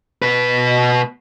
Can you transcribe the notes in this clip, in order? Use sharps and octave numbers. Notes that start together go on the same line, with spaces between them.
B2 B4